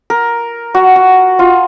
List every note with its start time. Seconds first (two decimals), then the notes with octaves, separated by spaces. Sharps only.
0.10 A#4
0.75 F#4
0.96 F#4
1.39 F4